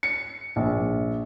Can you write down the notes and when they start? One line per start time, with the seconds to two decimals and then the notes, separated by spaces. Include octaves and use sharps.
0.03 C#7
0.56 A#1